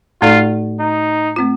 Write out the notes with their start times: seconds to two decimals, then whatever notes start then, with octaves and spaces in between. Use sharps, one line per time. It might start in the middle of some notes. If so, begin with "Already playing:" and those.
0.22 A2 A3 D#4 F4 A4 D5
0.79 D#4
1.36 A3 C4 F4